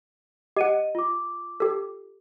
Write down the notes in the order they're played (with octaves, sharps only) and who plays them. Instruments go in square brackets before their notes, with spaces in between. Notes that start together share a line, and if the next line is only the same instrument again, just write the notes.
[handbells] G4 F#5 [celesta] D#5 D#7
[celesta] F4 D6
[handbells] G4 A4